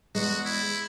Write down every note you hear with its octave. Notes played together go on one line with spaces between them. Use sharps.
E2 G#3 F#4
E4